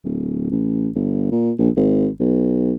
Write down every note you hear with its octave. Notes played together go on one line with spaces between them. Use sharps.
D1
A1
G1
A#2
A#1
G#1
B1